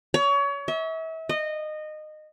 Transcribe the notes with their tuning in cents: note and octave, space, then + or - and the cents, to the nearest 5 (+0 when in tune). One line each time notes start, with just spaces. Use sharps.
C#5 +30
E5 -35
D#5 -20